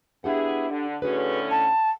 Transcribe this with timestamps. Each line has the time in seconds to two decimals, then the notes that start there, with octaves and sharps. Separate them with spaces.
0.24 B3 D4 E4 G4 G#4 F#5
0.70 D3
1.02 A2 D3 C#4 F#4 G#4 B4
1.51 F#5 A5